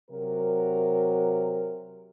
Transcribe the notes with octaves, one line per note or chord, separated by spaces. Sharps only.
C3 F#3 A#4